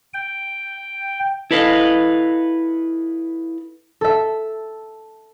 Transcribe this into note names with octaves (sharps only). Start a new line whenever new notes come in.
G5
E4 A4 B4 D#5 F5
A4 E5